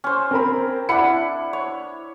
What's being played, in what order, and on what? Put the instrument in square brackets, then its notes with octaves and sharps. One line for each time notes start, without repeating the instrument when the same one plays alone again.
[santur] C#4 C5
[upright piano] C4 A#4 B5
[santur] D4 E4 [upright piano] F#5 B5 C#7
[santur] C#5